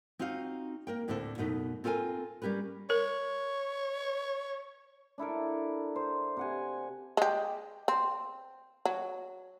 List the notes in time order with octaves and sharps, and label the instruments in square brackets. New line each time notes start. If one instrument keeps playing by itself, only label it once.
[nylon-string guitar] C4 D#4 F4 F#4 F5
A#3 A#4 G5
D2 A2 D3 C4 E4 A4
F#2 B2 A3 D#4
C4 F4 A4 A#4 G#5
G3 C#4 G4 A#4 B4
[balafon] A#4 [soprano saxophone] C#5
[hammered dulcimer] D4 E4 A4 A#4
C5
C3 F#5 G#5
[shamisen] G#3 G4
C4
F#3